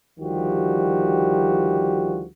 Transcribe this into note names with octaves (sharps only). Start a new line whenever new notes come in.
D2 D#3 F3 G3 F#4 G4